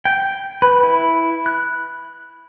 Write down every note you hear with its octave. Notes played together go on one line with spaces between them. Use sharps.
G5
B4
E4
F#6